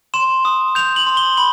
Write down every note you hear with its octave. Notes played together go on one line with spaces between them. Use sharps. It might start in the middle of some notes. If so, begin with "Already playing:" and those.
C6 E7
D#6
G6 F7
F#7
C6
G7
B5 F#7